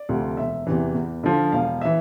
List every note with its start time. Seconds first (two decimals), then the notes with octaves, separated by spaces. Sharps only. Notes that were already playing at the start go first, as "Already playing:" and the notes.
Already playing: D5
0.09 D2 C3 F3
0.37 E1 E5
0.67 E2 C3 E3
0.94 E2
1.24 D3 F3
1.52 E1 F5
1.81 E3 E5